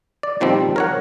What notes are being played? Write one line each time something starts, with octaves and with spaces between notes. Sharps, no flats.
D5
A#2 D#3 F3 G3 C4
A#4 C#5 F#5